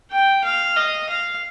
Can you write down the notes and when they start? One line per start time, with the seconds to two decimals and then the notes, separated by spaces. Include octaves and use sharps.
0.11 G5
0.44 F5
0.76 D#5
1.09 F5